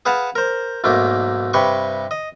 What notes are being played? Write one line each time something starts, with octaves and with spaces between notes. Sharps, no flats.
G#4 B4 F5 F#5 A5
A#4 C5
B1 G#2 A3 A#3 D4
G2 C3 B4 C6 C#6
D#5